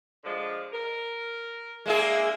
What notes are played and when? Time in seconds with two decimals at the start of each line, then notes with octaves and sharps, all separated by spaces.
0.24 D3 F3 G#3
0.72 A#4
1.86 G#3 A#3 D4 E4 G#4 E5